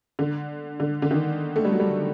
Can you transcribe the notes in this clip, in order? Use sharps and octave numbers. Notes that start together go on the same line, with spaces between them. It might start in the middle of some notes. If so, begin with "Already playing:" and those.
D3
D3
D3
D#3
A3
G3
F#3
G3